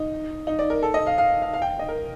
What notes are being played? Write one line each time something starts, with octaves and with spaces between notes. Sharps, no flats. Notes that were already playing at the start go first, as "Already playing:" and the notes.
Already playing: D#4
D#4
D5
A#4
A4
D#5
F5
F5
F5
F5
G5
D#5
A#4